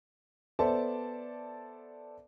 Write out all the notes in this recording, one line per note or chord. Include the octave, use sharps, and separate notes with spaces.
B3 A4 C5 D5 E5 A5